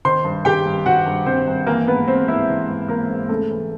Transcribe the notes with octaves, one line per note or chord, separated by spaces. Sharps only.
D#3 C5 C6
G2
D#3 G4 G5
G2
D#3 F#4 F#5
G2
D#3 C4 C5
G2
E3 A#3 A#4
G#2 B3 B4
E3 C4 C5
G#2 E4 E5
E3
G#2
E3 A#3 A#4
G#2
C#3 A3 A4
E3